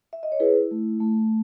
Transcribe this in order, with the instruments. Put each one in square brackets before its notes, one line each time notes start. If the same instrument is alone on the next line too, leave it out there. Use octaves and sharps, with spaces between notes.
[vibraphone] E5
D#5
C#5
E4 G#4 B4
A3
A3